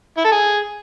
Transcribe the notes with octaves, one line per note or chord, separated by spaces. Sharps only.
E4
A4
G#4